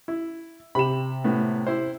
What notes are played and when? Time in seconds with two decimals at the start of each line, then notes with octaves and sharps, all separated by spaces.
0.08 E4
0.75 C3 G4 B5 E7
1.24 A2 B3
1.67 E4 C5